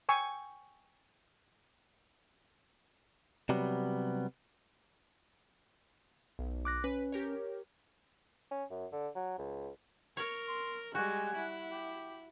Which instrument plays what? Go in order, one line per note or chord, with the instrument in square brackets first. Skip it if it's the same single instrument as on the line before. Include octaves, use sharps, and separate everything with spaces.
[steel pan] G5 G#5 C#6 E6
[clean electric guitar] C3 F#3 G3 B3
[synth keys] B1
[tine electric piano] D6 F#6 A#6
[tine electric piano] C#4 [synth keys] B4
[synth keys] G4 A#4 C#5
[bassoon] C#4
F#2
D3
F#3
C#2
[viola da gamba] A#4 [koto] C#5
[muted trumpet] C6
[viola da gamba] G3 G#3 [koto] F#4 [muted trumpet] G#5
[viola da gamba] E4
[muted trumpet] G4